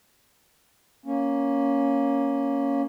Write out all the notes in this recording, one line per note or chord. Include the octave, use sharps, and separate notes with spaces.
A#3 C#4